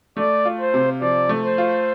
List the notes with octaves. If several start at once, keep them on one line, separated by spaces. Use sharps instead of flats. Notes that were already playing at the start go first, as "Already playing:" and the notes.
A3 D5
F4
C5
C3
F3 D5
A3
C5
F4